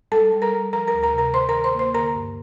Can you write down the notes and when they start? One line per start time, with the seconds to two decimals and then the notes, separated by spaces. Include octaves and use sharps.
0.12 G3 A4 A5
0.32 G3
0.42 A#4 A#5
0.53 G3
0.73 F3 A#4 A#5
0.87 A#4 A#5
0.93 D2
1.03 A#4 A#5
1.13 C3
1.18 A#4 A#5
1.34 D#3 C5 C6
1.49 D#3 A#4 A#5
1.64 C5 C6
1.75 A#3 C5 C6
1.94 D3 A#4 A#5
2.15 G2